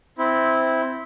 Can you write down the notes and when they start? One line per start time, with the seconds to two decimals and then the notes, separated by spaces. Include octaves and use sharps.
0.18 C4 E4